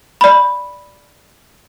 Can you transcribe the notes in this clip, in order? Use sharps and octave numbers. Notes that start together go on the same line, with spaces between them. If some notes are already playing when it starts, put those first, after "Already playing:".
D5 B5